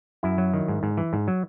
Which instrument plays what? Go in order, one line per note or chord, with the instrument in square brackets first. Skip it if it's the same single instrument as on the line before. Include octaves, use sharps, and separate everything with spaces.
[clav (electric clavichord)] F#2 E4
F#3
D#3
G#2
G#2
E3
G#2
F#3